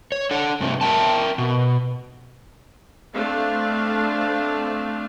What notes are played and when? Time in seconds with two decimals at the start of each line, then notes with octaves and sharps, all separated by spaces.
0.12 C#5
0.31 D4 A4 F#5
0.61 G2 C3 A3
0.81 A#4 C5 E5 G5 A5
1.38 B2
3.14 A3 C4 D4 F5